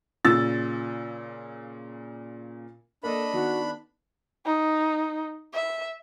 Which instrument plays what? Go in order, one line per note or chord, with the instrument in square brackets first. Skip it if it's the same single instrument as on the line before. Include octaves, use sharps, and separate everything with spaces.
[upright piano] A#2 C#3 E6 A6
[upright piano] A#3 [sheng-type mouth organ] D4 B5 [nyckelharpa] A4 D#5
[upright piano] D#3 [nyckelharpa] B3 [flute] F#4
[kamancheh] D#4
E5